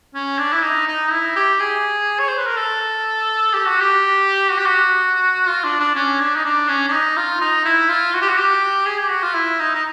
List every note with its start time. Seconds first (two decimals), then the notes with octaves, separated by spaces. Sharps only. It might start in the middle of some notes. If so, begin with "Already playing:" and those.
0.14 C#4
0.39 D4
0.53 E4
0.63 D#4
0.88 D#4
1.11 E4
1.36 G4
1.60 G#4
2.19 C#5
2.28 C5
2.38 B4
2.47 A#4
2.57 A4
3.53 G4
3.68 F#4
3.81 G4
4.51 F#4
4.58 G4
4.66 F#4
5.47 F4
5.64 D4
5.80 D4
5.95 C#4
6.20 D4
6.36 D#4
6.45 D4
6.68 C#4
6.88 D4
6.92 D#4
7.17 F4
7.41 D#4
7.65 E4
7.90 F4
8.13 F#4
8.21 G4
8.29 F#4
8.38 G4
8.86 G#4
8.98 G4
9.10 F#4
9.22 F4
9.34 E4
9.59 D#4
9.75 D#4